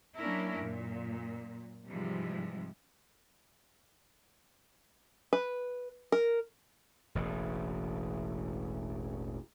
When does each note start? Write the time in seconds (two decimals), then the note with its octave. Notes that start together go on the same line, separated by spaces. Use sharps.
0.18 F#3 A#3 C#4 D4 E4 A#4
0.59 F#2 A#2
1.88 G#2 C3 E3 F3 G3 G#3
5.33 B4
6.12 A#4
7.15 E1 A1